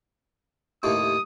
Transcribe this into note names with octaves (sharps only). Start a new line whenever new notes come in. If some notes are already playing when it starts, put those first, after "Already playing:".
D#2 A2 C3 D#6